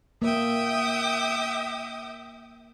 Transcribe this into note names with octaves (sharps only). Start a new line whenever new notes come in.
A#3 E5 G5 D#6